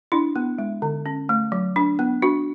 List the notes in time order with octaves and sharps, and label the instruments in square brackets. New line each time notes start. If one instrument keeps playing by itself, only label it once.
[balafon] D4 E4
B3
G#3
D3
C#4
A3
F#3
D4
B3
D4 F#4